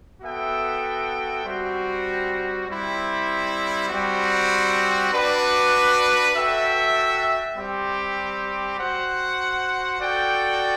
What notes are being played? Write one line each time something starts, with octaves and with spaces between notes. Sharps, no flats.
B3 F#4 A4 E5 G5
G3 C4 F#4
G3 C4 E4
G3 C4 F#4
D4 F#4 B4 D5
F#4 A4 E5 G5
G3 C4 G4
F#4 C5 F#5
F#4 A4 D5 G5